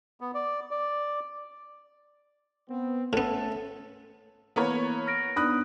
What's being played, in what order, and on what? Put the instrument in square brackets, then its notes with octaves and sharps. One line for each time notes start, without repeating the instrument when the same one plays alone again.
[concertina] B3
D5
D5
[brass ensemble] B3 C4
[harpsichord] A2 B3 [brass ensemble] A3 C#4 A4
[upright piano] E3 A#3 [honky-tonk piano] B3 A#4 C#5
[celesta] F6 A#6 D7
[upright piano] B3 D5 [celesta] D4 D#4 [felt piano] B5 D#6 F#6